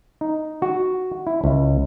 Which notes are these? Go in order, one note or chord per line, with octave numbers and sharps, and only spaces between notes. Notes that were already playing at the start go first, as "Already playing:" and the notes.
D#4
F#4
E4
C#2